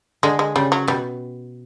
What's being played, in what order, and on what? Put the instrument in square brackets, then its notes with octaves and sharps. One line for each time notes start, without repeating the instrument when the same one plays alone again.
[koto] D3 [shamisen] G#3
[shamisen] G#3
[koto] C#3 [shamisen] G3
[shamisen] F#3
[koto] B2 [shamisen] G3